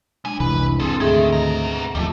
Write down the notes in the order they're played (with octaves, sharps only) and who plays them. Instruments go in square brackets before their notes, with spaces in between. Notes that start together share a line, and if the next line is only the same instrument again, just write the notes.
[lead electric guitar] F#3 G#5 [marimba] G#3 D4
[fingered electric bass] F1 C2 E3 [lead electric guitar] B4
[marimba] G#2 C4 [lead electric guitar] G#4 A4
[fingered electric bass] D2 [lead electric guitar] D#3 [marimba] G#4 A4 E5
[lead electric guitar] B3 A#5
[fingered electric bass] D#2 F3 [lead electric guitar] G3 A3 [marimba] D#5